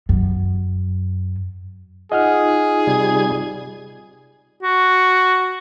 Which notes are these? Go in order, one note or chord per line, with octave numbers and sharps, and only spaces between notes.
F#2
D#4 F4 G#4 D#5 F#5 F6
C3 G3 G#6
F#4